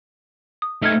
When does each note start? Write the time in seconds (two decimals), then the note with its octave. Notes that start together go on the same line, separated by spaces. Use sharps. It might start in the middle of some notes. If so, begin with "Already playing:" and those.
0.62 D#6
0.82 A3 D#4 E5 F6 G#6